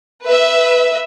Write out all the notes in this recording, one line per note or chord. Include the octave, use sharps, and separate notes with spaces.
B4 E5